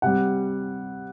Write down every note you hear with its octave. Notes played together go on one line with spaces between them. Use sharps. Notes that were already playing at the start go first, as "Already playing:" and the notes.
C3 G3 F#5